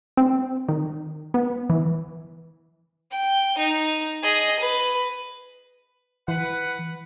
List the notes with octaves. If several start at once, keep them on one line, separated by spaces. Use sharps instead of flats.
C4
D#3
B3
E3
G5
D#4
G#4 D#5
B4
E3 B4 F#5